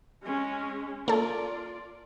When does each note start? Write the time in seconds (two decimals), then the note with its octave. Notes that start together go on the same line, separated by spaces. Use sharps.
0.23 G#3 C#4
1.08 A#3 F4 A4 D5